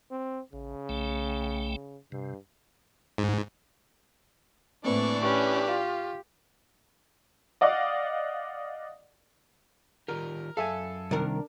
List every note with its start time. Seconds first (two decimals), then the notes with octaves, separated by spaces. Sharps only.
0.11 C4
0.53 A1 C#3
0.89 B1 A3 G5
2.12 G2 C3
3.18 G#2
4.85 A2 E3 A#3 C4 D4 B4 D5 C#6
5.23 C#4 G4 B4 C#6
5.68 F4
7.61 D5 D#5 F5 F#5 D6
10.08 D#3 F4 G4 A#4
10.57 F#2 A4 E5 F5 G#5
11.11 C2 D#3 D4 A#4